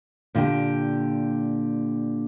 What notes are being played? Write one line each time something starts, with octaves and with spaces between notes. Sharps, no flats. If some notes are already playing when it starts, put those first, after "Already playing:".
A#2 D3 G4 D5 G5